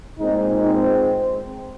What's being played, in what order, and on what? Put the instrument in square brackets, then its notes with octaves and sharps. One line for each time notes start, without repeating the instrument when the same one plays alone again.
[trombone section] A#2 G#3 C4 D#4
C4